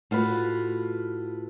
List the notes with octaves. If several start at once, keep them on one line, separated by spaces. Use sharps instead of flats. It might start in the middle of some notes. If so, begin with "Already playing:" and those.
A2 F4 F#4 B4